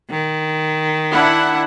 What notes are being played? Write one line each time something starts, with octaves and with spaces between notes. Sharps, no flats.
D#3
D4 E4 F#5